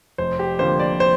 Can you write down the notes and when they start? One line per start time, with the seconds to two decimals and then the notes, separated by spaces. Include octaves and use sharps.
0.18 F1 C5
0.39 G4
0.59 F2 D3 F3 A#3 C5
0.79 D5
1.00 C5